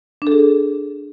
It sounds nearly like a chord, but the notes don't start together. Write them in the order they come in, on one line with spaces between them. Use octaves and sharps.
D4 A4 G#4